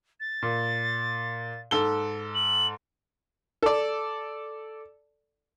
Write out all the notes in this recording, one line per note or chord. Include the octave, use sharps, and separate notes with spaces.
A6
A#2
G#2 A4 G7
F#7
A4 D5